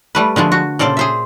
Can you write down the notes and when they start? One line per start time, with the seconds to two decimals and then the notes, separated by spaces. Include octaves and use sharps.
0.15 G3 A3 B4
0.36 D3 F3 G#3 A3
0.52 F#4
0.79 A#2 C#3 A4 C5 D5
0.97 G#4 C5 E5